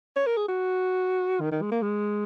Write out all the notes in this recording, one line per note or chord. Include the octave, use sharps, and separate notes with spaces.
C#5
A#4
G#4
F#4
D#3
D#3
G#3
A#3
G#3